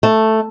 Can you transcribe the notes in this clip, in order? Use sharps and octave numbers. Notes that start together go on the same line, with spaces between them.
A3